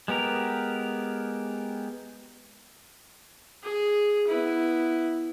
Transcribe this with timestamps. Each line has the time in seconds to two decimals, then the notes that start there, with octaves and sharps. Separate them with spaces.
0.08 G#3 B3 G4 A#4
3.63 G#4
4.27 B3 E4